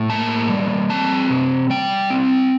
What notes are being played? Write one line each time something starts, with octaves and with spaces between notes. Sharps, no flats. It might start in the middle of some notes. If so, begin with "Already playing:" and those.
Already playing: A2
A#3 A5
G3
C4 A5
C3
G3 G5
C4